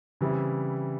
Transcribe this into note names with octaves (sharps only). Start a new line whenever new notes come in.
C#3 E3 G3 C4 E4